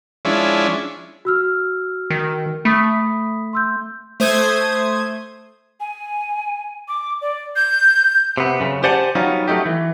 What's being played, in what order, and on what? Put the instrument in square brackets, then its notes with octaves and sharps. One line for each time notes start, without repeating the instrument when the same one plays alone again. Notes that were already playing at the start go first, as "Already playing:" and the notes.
[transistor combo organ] F3 G#3 C#4 D4 E4
[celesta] F#4 E6 F6
[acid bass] D#3
[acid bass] A3 [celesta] B5 D#6 B6
[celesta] C6 E6 G6
[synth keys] A3 C5 D#6 G#6
[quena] G#5
D6
D5
G6
[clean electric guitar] C3 B3
F#2 C#3
G4 C5 D5 F#5 G#5 A5
F#3 G3 B3 C#4 D#4 F4
F#3 A3 A#3 D#4 G4
E3